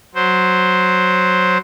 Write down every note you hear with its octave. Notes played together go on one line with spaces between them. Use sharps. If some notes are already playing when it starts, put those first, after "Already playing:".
F#3 C5